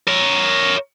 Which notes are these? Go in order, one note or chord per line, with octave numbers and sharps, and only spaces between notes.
A#4 C#5